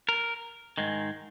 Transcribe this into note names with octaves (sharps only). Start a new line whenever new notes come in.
A#4
G#2 D#3 G#3